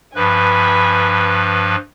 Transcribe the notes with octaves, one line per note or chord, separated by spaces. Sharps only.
G2 F3 B4 G#5 B5